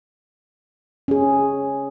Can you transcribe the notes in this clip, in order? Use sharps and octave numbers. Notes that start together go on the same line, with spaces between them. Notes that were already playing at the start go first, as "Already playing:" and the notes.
C#4 G#4